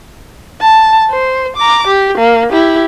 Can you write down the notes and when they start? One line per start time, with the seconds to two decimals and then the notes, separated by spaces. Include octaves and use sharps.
0.61 A5
1.11 C5
1.57 A#5 D6
1.88 G4
2.18 A#3
2.50 E4 G4